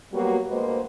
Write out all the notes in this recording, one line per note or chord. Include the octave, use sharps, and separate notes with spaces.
F#3 G3 A#3 B3 F#4 G4
D2 G#3 A#3 B4 C5